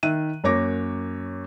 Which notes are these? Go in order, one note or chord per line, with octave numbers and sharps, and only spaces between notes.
D#3 E5 F#6 D#7
F#2 A#3 C#5 D6 A#6